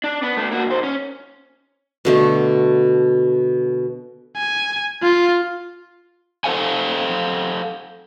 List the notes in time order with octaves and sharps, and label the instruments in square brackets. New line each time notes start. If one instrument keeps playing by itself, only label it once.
[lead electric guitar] D4
B3
A3 D4
A#3 F#4
B1 C5
C#4
[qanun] B2 D3 A3
[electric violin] G#5
F4
[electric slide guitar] A4 C5 F5 F#5 G#5